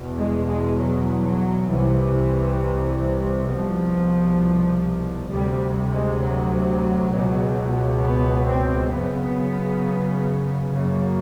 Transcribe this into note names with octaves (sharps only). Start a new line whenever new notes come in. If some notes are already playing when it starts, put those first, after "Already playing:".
Already playing: E2 B2
G#3
G#3
F#3
F#3
C2 C3 E3
C2 B2 F3
D2 C3 G3
G#3
F#3
C#2 B2
B3
C4
F#2 C#3 B3
F#2 C#3 A#3